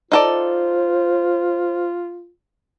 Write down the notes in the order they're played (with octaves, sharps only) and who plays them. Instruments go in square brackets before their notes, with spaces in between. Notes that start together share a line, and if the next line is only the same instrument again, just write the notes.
[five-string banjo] D#4 A4 D5 [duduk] F4 [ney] C5